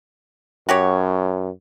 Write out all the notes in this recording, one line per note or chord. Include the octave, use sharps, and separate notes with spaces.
F#2 F#4 G4 C#5